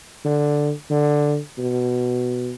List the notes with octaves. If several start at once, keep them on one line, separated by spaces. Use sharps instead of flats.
D3
D3
B2